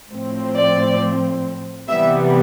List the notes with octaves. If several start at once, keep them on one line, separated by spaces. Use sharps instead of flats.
A2 F3 C4
D5
C3 E3 G3 B3 E5